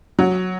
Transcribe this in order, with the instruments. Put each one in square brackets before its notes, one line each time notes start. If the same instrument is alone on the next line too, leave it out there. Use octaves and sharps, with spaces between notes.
[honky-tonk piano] F#3